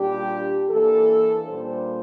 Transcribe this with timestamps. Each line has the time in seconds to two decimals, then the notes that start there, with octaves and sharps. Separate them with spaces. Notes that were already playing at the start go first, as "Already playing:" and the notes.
Already playing: A#2 G3 D4 G4
0.69 E3 A#3 D4 A4
1.48 A#2 G3 A#3 D4 C5